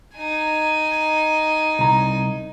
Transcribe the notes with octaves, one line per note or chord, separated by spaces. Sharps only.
D#4 G#5
C2 A#5